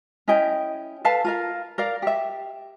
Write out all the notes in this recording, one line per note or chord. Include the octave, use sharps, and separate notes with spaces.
C#4 E4 D#5 G5
A4 B4 F5 A5
F4 A#4 F5
A#4 D5 F5
G4 E5